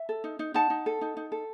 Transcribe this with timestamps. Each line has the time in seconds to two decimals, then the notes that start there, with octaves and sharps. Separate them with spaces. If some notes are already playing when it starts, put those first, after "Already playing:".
Already playing: E5
0.09 A4
0.24 D#4
0.39 D#4
0.54 D#4 F#5 A5
0.70 D#4
0.86 A4
1.01 D#4
1.17 D#4
1.32 A4